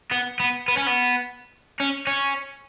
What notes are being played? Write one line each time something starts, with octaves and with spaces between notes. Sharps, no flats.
B3
B3
B3
C#4
B3
C#4
C#4